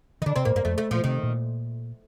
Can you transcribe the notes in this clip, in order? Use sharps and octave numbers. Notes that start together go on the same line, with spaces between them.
D#3 D#4
D3 D4
C3 C4
A2 A#3
G2 A#3
F2 A3
A3
A#2 F3
C3 D#3
A#2